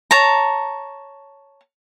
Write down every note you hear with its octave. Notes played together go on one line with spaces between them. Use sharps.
C#5 A5 A#5